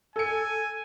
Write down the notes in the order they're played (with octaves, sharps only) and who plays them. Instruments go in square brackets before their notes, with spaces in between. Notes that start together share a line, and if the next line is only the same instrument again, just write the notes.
[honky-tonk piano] A4 C#7 [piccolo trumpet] G#5